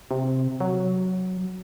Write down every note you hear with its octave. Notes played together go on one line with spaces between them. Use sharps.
C3
F#3